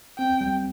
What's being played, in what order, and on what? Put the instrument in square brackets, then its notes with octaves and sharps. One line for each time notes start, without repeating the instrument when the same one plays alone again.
[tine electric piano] C4 [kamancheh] G5
[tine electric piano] G3